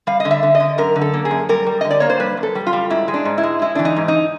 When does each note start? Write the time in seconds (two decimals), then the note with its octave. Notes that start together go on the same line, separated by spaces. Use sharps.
0.07 G3 F5
0.20 D#5
0.25 D3
0.31 E5
0.43 D3
0.55 D#5
0.60 D3
0.78 F#2 A#4
0.96 D3
1.01 A4
1.14 A#3
1.25 G#4
1.31 F#2
1.49 G3 A#4
1.67 G3
1.81 D3 D#5
1.91 D5
2.00 A#3 C#5
2.10 C5
2.20 G3 B4
2.37 F#2
2.43 A4
2.55 G3
2.67 F4
2.73 G3
2.90 G#2 E4
3.08 G#3
3.14 D4
3.25 G#2
3.38 E4
3.43 G#3
3.62 G#3 E4
3.75 E3 D4
3.85 D#4
3.96 G#2
4.08 D#4